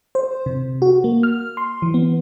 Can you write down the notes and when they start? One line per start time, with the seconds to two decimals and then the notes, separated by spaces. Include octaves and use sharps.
0.15 C5
0.46 C3
0.82 F#4
1.04 A#3
1.23 F6
1.57 C6
1.82 E3
1.94 B3